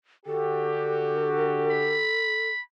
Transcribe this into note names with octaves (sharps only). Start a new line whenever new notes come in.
D3 F#4 G4 A4
B5